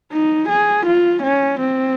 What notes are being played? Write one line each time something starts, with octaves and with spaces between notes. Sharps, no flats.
D#4
G#4
F4
C#4
C4